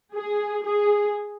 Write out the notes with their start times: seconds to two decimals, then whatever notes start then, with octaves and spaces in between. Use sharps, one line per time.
0.13 G#4
0.64 G#4